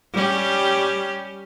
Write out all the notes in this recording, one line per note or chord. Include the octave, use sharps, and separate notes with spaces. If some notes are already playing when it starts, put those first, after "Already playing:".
G3 C#4 G4